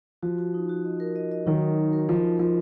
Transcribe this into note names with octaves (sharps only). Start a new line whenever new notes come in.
F3 F#4
F#4
D#4
F#4
D#5
A#4
D#5
D#5
D#3 F#3 D#4
D#4
D#5
A#4
F3 A#4
D#4
F3 A#4